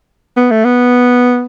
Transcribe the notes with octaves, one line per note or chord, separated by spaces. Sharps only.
B3
A3
B3